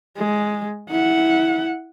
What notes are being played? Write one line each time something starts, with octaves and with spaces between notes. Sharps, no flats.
G#3
E4 F#5